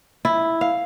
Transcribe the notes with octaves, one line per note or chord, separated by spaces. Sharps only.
E4
F5